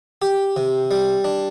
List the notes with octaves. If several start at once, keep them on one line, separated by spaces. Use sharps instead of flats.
G4
C3
G3
D4